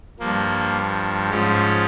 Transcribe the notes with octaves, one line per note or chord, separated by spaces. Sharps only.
G2 F3 A#3
G#2 F3 C#4